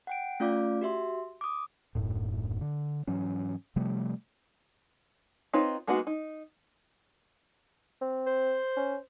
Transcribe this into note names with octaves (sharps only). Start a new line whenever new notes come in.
F#5 G5 D7
A3 C#4 F4 D5 F5 D6
F#4 G4 E5 C6
D6 D#6
D#1 F#2 A2
D3
G#2 E3 F#3 C#4
C3 F3 G3 A3
C4 D#4 F4 B4 C#5
G#3 A#3 B3 D#4 F#4
D#4
C4
C5
C#4